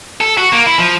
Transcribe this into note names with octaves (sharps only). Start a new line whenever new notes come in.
A4
F#4
A#3
E4
F3